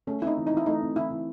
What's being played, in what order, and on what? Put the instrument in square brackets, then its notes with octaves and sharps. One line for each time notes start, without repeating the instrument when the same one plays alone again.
[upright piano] A3 [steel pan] C#4
[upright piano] C4 [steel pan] D#4 E4
[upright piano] E3
[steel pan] D#4
[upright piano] E3 [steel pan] E4
[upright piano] A3 [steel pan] D#4
[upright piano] C4
[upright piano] E3 [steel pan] E4
[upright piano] E3